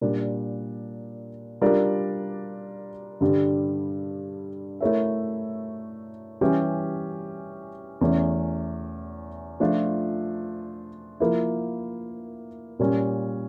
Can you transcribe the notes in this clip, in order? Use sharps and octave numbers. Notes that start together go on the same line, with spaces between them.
A#2 G3 D4
G3 D4 F4 A#4 D5
G2 D3 G3
A3 E4 A#4 C#5 E5
E3 G3 C#4 G4
E2 E3 A3 C#4
F3 A3 D4 F4
F3 A#3 E4
A#2 G3 C#4